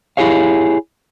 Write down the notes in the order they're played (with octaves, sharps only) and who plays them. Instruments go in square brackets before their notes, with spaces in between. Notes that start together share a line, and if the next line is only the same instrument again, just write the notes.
[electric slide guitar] E4 G4 G#4 C#5 F5